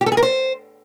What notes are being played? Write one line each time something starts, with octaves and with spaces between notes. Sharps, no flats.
G4
A4
G#4
A#4
C5